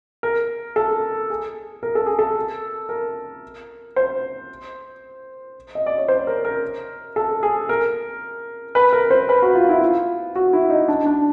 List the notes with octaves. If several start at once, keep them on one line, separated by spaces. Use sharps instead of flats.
A#4
A4
G#4
A#4
A4
G#4
A4
A#4
C5
D#5
D5
C#5
C5
A#4
A#4
A4
G#4
A#4
B4
A#4
C5
B4
F#4
F4
E4
F4
F#4
E4
D#4
D4
D4